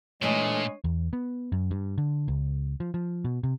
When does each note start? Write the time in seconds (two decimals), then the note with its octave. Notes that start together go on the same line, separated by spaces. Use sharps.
0.22 A#2 E3 G#3 A3 D4 C#5
0.84 E2
1.13 B3
1.52 F#2
1.71 G2
1.98 D3
2.28 C#2
2.80 F3
2.94 F3
3.25 B2
3.43 C3